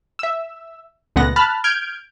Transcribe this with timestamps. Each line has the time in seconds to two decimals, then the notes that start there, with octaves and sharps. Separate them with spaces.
0.19 E5 E6
1.16 C#2 A#2 A3 B3 F#5 A#6
1.36 A5 B5 F6 F#6
1.64 F6 G6 G#6 D7